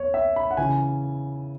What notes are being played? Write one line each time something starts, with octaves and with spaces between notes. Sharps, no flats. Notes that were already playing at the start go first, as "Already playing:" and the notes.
Already playing: E2 C#5
E5
B5
F#5
C#3 E3 G#5